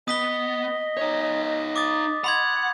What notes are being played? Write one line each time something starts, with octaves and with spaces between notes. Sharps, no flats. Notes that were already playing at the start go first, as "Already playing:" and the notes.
B3 D#5 D#6 B6 G7
D#4 C#5
D6 D#6 A6
F#5 B5 C6 G#6